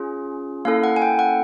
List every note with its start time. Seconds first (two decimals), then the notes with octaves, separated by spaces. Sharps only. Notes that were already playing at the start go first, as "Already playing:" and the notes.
Already playing: C#4 F4 G#4
0.65 A#3 C#4 E4 A4 F5
0.84 F#5
0.96 G#5
1.02 G5
1.19 F#5